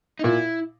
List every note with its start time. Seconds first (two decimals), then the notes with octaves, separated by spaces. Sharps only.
0.19 D#4
0.24 A#2 E4